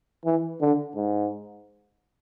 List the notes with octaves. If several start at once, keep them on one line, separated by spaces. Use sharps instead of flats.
E3
D3
G#2